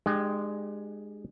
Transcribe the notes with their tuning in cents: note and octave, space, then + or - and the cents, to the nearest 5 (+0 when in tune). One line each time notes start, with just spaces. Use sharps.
G#3 +0 D4 +45 G4 +0